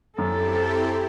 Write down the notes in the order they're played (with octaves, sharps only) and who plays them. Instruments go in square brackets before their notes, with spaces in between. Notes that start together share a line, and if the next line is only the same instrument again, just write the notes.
[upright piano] F#2 [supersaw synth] C4 E4 G4 [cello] A4